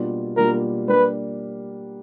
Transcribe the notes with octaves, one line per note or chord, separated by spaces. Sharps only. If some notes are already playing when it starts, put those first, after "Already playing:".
Already playing: B2 G3 A#3 D4 F4
B2 G3 A#3 D4 F4 A#4
G3 A#3 D4 B4